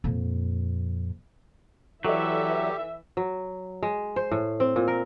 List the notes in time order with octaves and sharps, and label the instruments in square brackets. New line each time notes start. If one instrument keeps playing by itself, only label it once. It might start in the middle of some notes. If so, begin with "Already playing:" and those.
[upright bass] F2 A#2
[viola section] E3 E5 [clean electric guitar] F#3 [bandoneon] G4 [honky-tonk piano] A4 D5
[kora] F#3
G#3
C5
A2
C4
A#2
A#4